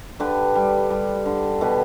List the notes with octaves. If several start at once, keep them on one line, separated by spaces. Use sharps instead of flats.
D3 G4 B4
G3
G3
D3
B2 G4 B4